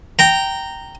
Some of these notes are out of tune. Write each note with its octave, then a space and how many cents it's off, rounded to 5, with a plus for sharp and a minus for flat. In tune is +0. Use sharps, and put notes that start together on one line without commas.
G5 -10 A#5 -10